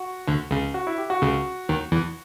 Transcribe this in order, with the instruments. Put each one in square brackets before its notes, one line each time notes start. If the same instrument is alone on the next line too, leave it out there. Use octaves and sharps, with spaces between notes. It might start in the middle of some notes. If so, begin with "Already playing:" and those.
Already playing: [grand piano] F#4
[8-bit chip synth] D2 D3
C#2 C#3
[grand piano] F#4
E4
G4
F#4
[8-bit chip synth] C#2 C#3
D#2 D#3
E2 E3